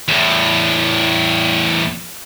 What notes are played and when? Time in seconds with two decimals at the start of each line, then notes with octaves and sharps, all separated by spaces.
0.08 E2 A2